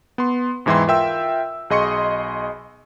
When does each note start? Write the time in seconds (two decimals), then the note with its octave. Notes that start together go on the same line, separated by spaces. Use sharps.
0.18 B3 C6
0.66 E2 G#2 E3 E4 G5 C6
0.88 F4 A#4 E5 G5 E6
1.70 B1 G#4 D#5 C6 C#6 C#7